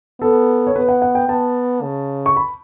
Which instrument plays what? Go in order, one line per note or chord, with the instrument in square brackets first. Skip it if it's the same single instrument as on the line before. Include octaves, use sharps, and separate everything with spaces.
[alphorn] B3 [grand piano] A4
[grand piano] C#5
[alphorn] B3 [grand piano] B4
[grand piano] F#5
F#5
G5
[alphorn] B3 [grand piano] A5
[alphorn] C#3
[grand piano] C#6
B5